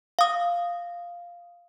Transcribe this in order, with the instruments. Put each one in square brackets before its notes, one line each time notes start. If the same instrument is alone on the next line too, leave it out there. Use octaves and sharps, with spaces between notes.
[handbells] F5 D#6